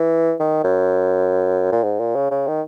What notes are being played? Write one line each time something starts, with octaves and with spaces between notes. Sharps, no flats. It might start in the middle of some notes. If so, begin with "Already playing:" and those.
Already playing: E3
D#3
F#2
A#2
G#2
A#2
C#3
C#3
D#3